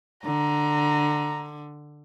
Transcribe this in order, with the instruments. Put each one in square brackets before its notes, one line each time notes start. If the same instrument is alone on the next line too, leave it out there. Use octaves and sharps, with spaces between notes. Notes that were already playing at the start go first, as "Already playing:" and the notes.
[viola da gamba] D3 [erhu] A#5